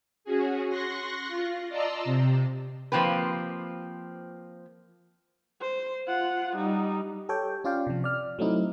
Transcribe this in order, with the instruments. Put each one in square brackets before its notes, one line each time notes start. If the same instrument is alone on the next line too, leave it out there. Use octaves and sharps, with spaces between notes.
[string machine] C#4 F#4 G#4
C6 C#6 F#6 A#6
F4
D5 D#5 A5 A#5 C6 E6
C3
[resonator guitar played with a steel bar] F3 A#3 C4 G4 B4
[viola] C5
F4 F#5
G3 D#4
[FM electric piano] G4 A4 C#5 G5
C#4 F4 D5 F5 G5
C3 F3
D5 F6
F#3 A3 C4 D#4 E4